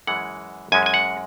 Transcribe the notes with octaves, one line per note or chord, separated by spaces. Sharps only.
F#2 E3 G#3 C#4 F#5
F#2 E3 G#3 C#4 G#5
G#5
F#5